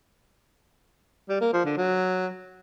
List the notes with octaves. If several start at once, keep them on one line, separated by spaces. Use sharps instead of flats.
G3
A#3
F3
D3
F#3